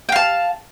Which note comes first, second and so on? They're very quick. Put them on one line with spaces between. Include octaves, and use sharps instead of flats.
G5 F5 A5